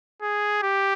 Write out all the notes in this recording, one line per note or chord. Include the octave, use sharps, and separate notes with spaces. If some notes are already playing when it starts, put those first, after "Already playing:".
G#4
G4